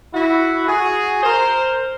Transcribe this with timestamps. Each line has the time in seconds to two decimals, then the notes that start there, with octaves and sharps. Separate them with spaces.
0.14 E4 F#4
0.68 F#4 G#4
1.23 A#4 C5